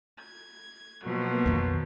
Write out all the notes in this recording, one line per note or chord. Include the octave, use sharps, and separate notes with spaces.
G#6
B2 F3 F#3 A#3 B3
F2 D#3